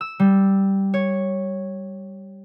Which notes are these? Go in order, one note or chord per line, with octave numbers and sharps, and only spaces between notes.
E6
G3
C#5